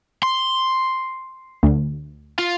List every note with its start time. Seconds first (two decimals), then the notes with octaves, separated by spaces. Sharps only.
0.23 C6
1.63 D2
2.39 F4